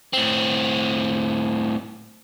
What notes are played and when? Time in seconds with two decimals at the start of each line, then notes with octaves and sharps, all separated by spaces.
0.13 A2 C4